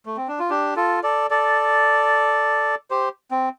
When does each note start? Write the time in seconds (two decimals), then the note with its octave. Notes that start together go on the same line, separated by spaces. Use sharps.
0.06 A3
0.17 C4
0.28 D4
0.39 F4
0.50 D4 G4
0.76 F4 A4
1.03 A4 D5
1.31 A4 D5
2.90 G4 C5
3.31 C4